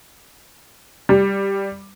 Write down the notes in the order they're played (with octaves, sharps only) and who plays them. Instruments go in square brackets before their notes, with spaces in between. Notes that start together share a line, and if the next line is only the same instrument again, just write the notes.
[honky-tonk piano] G3